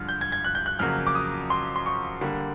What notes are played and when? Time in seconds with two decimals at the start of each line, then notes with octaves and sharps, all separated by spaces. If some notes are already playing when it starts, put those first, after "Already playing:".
Already playing: G2 D3 F3 G#3 F6
0.09 G6
0.21 G#6
0.32 G#6
0.45 F#6
0.55 G6
0.66 F#6
0.79 F2 C#3 F#3 A#3 F6
1.07 D6
1.15 D#6
1.50 C6
1.76 C6
1.86 C#6
2.21 D3 G3 A#3